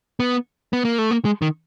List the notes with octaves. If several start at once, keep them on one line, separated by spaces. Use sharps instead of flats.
B3
B3
A#3
A3
A#3
G#3
D#3